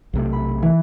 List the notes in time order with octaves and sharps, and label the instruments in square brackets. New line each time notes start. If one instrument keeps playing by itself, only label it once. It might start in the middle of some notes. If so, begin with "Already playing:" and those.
[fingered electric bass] B1 C3 A3
[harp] B5
E3